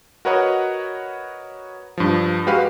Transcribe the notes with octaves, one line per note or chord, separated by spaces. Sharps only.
F#4 A#4 B4 C#5 D#5 F#5
G2 F3
G#3 F#4 G4 B4 F5